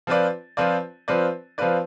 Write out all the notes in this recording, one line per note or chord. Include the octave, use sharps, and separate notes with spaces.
F3 C4 F4 B4 D5
F3 C4 F4 B4 D5
F3 C4 F4 B4 D5
F3 C4 F4 B4 D5